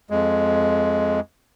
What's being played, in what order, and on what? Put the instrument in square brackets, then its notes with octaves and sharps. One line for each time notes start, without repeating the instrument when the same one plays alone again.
[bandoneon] F2 G#3